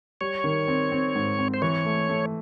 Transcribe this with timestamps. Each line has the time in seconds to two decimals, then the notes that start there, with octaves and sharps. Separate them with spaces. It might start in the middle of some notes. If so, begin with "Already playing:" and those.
0.21 G3 C#5
0.44 D#3
0.68 C4
0.92 C4
1.15 G#2
1.39 C4
1.54 C5
1.62 E3 C#5
1.85 A3
2.09 A3